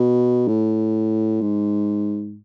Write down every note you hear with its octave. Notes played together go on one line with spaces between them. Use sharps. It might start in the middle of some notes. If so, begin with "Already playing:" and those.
Already playing: B2
A2
G#2